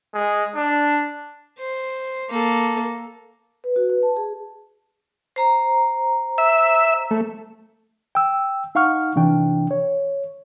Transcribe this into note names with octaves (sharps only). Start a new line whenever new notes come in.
G#3
D4
C5
A#3 A4
B4
F#4
B4
A5
G#4
C5 A#5
E5 E6
A3
G5 E6
D#4 F5 F#5 C#6 F6
C3 E3 D4 G5
C#5